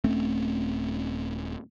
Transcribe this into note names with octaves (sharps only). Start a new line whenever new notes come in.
D#1 A3 C4 C#4